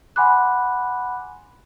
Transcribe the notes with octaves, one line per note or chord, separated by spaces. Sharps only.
F#5 G#5 B5 C6 D6 F#6